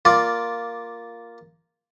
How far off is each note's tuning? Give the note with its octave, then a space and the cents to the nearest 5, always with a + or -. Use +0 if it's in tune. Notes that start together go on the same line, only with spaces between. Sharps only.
A#3 +0 F4 +0 D5 +0